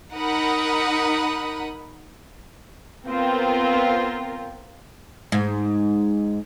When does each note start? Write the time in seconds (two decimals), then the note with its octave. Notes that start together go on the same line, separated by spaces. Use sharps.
0.14 D#4 A#4 F#5 B5 D#6
3.07 B3 C4 F4 A#4
5.32 G#2